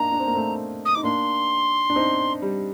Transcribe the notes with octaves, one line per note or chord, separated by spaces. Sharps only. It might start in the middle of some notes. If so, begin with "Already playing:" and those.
Already playing: A#3 D4 D#4 A#5
D4
C4
A#3
A3 C4
D#6
D#4 D6
A#3 D4 C6
D4
C4 D#4
G3